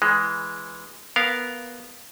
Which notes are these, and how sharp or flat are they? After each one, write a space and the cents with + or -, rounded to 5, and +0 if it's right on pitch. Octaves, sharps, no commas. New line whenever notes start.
E3 +0 G#3 +0
B3 -5 A#4 +0 F5 +0